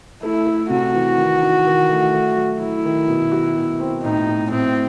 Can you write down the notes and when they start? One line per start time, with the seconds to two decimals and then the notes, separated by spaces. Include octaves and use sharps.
0.23 A3 E4
0.46 A3
0.70 C3 F#4
0.94 E3
1.18 D#3
1.42 D#4
1.66 D#3
1.89 A3
2.14 A3
2.36 F#3
2.61 F#3 E4
2.85 D#3
3.08 B2
3.32 F#4
3.56 B2
3.80 C4
4.03 A2 D#4
4.28 A2
4.51 A2 C4